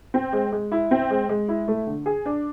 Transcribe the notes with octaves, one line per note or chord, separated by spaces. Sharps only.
C4
G#3
G#3
E4
C4
G#3
G#3
E4
A3
D3
G#4
D4